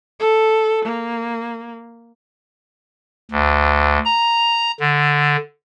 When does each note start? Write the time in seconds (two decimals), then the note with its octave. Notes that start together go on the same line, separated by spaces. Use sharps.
0.20 A4
0.85 A#3
3.31 D2
4.05 A#5
4.80 D3